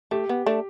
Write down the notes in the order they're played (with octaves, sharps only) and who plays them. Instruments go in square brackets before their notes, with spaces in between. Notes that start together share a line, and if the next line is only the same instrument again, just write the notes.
[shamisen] A3 [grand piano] G4
[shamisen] B3
A3 D4